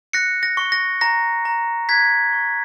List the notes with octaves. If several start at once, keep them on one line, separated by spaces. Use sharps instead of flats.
F#6 A#6 C#7
A#6
C#6
A#6
A#5 A#6
A#5
F#6 G#6 B6
C#6